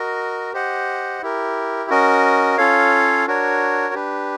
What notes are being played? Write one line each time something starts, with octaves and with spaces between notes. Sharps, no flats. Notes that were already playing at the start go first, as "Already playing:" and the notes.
Already playing: F#4 A#4 D#5
G4 C5 D#5 F#5
E4 G4 A#4
C#4 F#4 A#4 D#5
C#4 F4 A4 C#5 F5
D4 F#4 A#4 C#5
D4 G4 B4